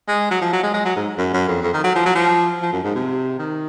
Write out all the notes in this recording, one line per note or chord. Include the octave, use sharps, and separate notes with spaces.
G#3
F#3
F3
F#3
G#3
G#3
F#3
G#2
F#2
F#2
F2
F2
D#3
F#3
F3
F#3
F3
F3
F#2
G#2
C3
D#3